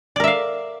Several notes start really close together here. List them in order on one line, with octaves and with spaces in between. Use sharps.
D5 A#4 E5 F5